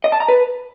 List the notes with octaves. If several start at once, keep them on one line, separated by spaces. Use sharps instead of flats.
D#5
A5
A#5
B4